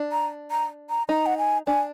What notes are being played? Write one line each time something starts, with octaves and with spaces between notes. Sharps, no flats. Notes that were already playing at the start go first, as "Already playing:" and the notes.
Already playing: D4
A#5
A#5
A#5
D#4 A#5
F#5
G#5
D4 G#5